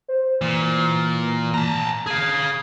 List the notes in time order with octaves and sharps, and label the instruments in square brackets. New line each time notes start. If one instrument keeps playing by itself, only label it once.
[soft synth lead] C5
[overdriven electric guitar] A#2 [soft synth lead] E3
[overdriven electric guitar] A5 A#5
[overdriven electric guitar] G#4 F5 [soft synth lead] G#6